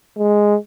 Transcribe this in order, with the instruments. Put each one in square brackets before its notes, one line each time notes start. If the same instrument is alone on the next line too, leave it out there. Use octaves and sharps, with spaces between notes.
[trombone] G#3